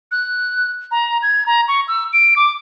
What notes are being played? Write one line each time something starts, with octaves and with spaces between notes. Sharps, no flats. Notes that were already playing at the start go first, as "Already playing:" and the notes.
F#6
A#5
G#6
A#5
C#6
E6
D7
D6